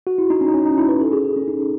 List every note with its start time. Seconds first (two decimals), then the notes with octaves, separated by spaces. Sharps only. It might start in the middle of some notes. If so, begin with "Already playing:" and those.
0.07 F#4
0.18 E4
0.30 D#4
0.41 C#4
0.48 D#4
0.54 C#4
0.65 D#4
0.78 E4
0.89 B4
1.01 A4
1.12 G#4
1.25 G#4
1.36 C#4
1.48 D#4